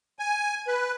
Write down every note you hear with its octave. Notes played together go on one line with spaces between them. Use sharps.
G#5
B4